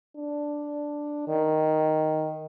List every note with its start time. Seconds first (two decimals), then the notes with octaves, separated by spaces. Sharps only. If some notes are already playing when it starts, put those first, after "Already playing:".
0.16 D4
1.28 D#3